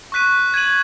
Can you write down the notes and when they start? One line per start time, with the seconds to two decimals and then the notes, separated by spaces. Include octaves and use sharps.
0.12 C#6 F#6 B6 D#7
0.54 G#6 D#7 F#7